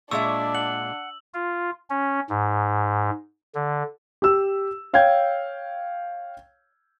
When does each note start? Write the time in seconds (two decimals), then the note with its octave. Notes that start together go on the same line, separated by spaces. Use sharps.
0.11 A#2 G#3 D4 E5 C#6 E6
0.55 F#5 F#7
1.34 F4
1.90 C#4
2.30 G#2
3.55 D3
4.22 G4 E6
4.93 C#5 F5 G5 G6 G#6